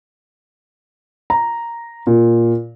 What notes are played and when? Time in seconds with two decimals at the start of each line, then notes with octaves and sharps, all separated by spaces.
1.30 A#5
2.07 A#2